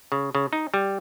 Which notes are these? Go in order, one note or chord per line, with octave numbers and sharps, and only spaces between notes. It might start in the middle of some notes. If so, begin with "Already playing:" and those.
C#3
C#3
D#4
G3